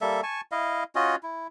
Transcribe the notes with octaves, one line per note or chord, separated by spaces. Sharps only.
G3 A#3 A4 E5
G#5 A5 C#6
E4 D#5 F5
C#4 F4 F#4 D#5
E4